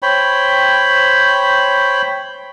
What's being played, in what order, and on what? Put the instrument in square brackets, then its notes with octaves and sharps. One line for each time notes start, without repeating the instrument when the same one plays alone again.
[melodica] C5 C#5 G5 B5